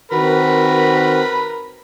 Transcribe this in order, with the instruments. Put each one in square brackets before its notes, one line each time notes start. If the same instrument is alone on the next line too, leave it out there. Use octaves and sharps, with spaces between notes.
[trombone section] D#3 C4 F#4 [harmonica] A#4 B4 B5